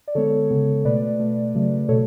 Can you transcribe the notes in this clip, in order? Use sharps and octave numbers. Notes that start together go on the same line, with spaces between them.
D5
D3 G#3 B3 A4 C#5
C#3 G#3 B3
B2 A3 B4 D5
B2 A3
C#3 F#3 A3
B2 A3 A4 C#5